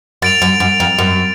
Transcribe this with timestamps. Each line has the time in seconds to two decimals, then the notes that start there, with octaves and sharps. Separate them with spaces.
0.22 F#2 A6 D7 F7
0.42 F#2
0.60 F#2
0.80 F2
0.99 F#2